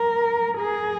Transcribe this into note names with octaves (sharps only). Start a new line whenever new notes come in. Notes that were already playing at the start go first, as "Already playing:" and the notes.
Already playing: A#4
G#4